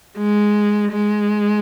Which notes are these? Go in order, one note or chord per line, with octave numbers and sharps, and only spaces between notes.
G#3
G#3